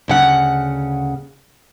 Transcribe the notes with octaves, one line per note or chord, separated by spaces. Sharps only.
D2 C#3 F#5